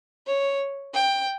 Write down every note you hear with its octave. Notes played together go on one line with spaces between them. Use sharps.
C#5
G5